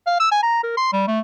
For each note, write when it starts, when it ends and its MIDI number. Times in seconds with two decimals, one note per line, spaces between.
0.07 0.17 77
0.20 0.27 88
0.31 0.39 80
0.43 0.63 82
0.63 0.74 70
0.77 0.91 84
0.93 1.03 55
1.07 1.20 57